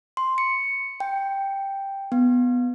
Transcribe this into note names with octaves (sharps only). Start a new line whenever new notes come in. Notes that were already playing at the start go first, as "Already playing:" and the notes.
C6
C#7
G5
B3